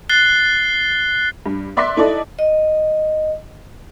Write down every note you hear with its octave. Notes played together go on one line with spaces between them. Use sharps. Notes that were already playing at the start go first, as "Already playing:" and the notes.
F#6 A6 C7 G7
G2
D5 E5 C6 D6 F#6 B6
D#4 E4 A4 D5 D#5
D#5